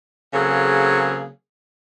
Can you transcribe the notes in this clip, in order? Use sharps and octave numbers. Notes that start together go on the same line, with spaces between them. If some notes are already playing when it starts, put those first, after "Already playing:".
C#3 F#3 A#3 C4 G#4 A4